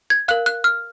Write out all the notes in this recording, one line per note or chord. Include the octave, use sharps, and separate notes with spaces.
G#6
A#4 F5 F#6
F#6
F6